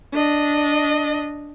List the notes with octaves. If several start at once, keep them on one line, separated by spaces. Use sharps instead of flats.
D4 D#5